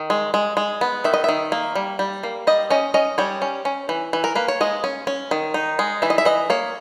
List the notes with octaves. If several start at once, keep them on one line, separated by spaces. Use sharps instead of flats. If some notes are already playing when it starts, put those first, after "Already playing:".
Already playing: D#3
G#3
G#3
G#3
B3
D#3 E5
D#5
D#3 E5
A#3
G3
G3
A#3
G3 D#5
C#4 D#5
C#4 D#5
G3 C#5
C#4
C#4
E3
E3
A#4
A#3 B4
C#5
G#3 D#5
C#4
C#4
D#3
D#4
G#3
E3 E5
D#5
E5
E3 D#5
A#3 C#5